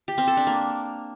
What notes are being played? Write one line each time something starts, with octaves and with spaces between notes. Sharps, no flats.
G4
C4
A4
D4
A#3